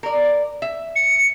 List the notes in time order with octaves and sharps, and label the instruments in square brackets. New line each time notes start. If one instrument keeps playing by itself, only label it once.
[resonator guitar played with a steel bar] A#4 D5
E5
[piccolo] C#7